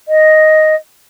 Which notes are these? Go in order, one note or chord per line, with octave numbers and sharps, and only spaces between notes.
D#5